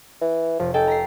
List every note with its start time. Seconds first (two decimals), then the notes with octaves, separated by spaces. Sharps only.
0.22 E3
0.60 F1 F3
0.74 D#4 A4 G5 G#5
0.87 A#5 B6 C7